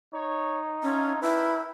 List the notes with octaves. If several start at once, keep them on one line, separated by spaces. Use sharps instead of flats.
D#4 C#5
C#4 F4 A4 E5
D4 E4 A#4 B4 G5